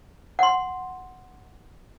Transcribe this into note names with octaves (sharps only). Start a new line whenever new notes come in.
F#5 C6